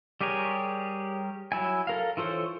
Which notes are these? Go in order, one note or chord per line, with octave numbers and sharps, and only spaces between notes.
G3 G4 G#4 A#4 C#5
F#3 E4 G#5
A4 A#4 F5
E3 F4 A4 C5 C#5